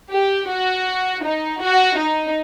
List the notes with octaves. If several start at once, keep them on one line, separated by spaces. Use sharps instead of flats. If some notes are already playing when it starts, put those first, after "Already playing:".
G4
F#4
D#4
F#4
D#4